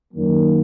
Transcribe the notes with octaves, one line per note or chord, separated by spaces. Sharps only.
F#2 D#3 F#3 A#3